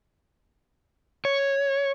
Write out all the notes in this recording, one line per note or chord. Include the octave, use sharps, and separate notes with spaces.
C#5